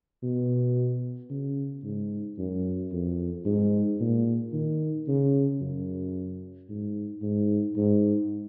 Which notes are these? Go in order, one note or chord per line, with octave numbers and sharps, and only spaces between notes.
B2
C#3
G#2
F#2
F2
G#2
A#2
D#3
C#3
F#2
G#2
G#2
G#2